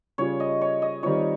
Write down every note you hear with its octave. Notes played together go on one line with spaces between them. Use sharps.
C#3 G3 C#4 F4 G#4 C#5
D#5
C#5
D#5
D#3 G3 C4 F4 C#5